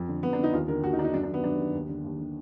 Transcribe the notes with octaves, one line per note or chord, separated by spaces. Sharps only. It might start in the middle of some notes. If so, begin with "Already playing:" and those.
Already playing: F2
D3
F2 B3
D4
D3
D#4
D#2 F4
D3 A#4
D#2 F#4
D#4
D3 D4
D#4
F#2 D4
D4
D#3 B3
F#2 D4
D#3
D#2
D3
D#2
D3